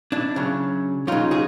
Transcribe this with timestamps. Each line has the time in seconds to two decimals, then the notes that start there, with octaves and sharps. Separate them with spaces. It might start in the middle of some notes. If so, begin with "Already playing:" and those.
0.12 D4 E4
0.36 C#3 F#3
1.07 C#3 F#3 D#4 F4
1.31 F#4 G#4